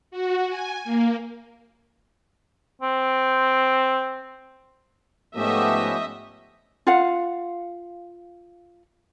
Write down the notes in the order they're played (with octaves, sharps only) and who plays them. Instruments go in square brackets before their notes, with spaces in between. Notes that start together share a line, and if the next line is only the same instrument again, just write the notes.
[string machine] F#4
G#5
A#3
[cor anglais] C4
[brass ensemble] G#2 F3 A3 [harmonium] B3 C#4 G4 [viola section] D#5 E5
[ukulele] F4 F5 F#5